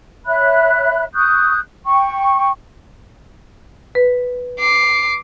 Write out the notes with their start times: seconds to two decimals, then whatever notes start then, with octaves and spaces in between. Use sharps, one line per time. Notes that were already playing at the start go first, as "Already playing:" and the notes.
0.27 C#5 E5 B5 F#6
1.14 C#6 D#6 F#6 G6
1.86 G5 C#6
3.95 B4
4.58 D6 C7